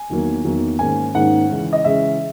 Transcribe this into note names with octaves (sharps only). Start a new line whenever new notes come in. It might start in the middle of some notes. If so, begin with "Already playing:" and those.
Already playing: G#5
E2 D#3 F#3 A#3
E2 D#3 F#3 A#3
G#2 D#3 A#3 C#4 G#5
G#2 D#3 A#3 C#4 F#5
C#3 E3 G#3 C#4
D#5
C#3 E3 G#3 C#4 E5